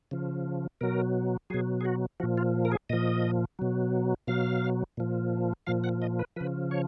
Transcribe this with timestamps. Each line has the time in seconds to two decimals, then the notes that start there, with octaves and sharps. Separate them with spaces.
0.11 C#3 F3
0.81 B2 F#3 A#4
1.50 B2 F#3 G#4
1.81 G#4
1.85 F#4
2.20 A#2 F3 F#4
2.38 F4
2.65 A#4
2.72 G#4
2.89 A#2 F3 D#5
3.59 B2 F#3
4.27 B2 F#3 F5
4.97 A#2 F3
5.67 A#2 F3 F5
5.84 F#5
6.02 D#5
6.19 B4
6.36 C#3 F3 B4
6.71 C#5